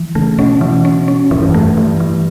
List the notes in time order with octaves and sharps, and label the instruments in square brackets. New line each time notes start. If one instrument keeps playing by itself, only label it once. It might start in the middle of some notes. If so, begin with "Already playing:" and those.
Already playing: [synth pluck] E3
[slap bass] C#3 [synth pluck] A3
[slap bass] B2 [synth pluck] C#4
[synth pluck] E3
C#4
C#4
[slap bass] A2 [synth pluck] E3
[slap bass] G2
F#2
[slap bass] G2 [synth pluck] A3
[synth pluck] E3
E3